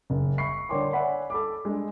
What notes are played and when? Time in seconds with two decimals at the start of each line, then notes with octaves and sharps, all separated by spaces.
0.10 F#1
0.38 E5 B5 C#6 C7
0.69 D3 A#4 C#5 G5 C6 D6
0.93 C#5 D5 E5 F#5 G#5 B5
1.30 A4 B5 D6
1.65 G#3 D4